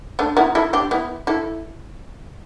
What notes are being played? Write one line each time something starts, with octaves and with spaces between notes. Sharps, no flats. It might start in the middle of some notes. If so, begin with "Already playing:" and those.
A3 D4
B3 E4
E4 A4
D4 G4
B3 E4
E4 A4